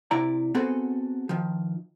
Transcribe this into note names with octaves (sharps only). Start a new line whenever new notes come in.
C3 E4 D5 A#5
B3 C4 F#4 G#4 A4
D#3 F3